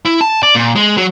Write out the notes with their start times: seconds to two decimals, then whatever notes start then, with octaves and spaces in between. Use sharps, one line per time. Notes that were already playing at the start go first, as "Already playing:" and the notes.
0.05 E4
0.21 A5
0.43 D5
0.55 A#2
0.75 G#3
0.97 F#3